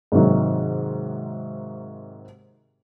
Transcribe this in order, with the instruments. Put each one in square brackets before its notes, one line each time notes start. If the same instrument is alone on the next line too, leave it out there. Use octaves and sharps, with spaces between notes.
[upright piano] G#2 C3 D#3 F#3 A#3